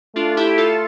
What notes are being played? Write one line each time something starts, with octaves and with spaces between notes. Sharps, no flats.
A3 D4 F4
E4 G4
F4 A4